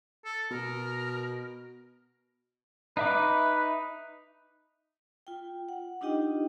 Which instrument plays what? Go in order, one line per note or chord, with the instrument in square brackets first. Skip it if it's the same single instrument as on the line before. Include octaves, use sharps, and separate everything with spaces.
[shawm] A4
[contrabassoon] B2 [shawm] A#4
[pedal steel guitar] D#4 E5 D6 [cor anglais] B4
[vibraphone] F4 G5
F#5
D4 D#4 F4 G4 D#5 G5